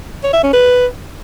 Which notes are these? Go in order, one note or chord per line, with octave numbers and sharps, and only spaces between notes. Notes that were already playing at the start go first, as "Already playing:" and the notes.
C#5
E5
C#4
B4